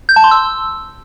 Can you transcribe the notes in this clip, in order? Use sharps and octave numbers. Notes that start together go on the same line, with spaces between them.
G6
A5
C6
E6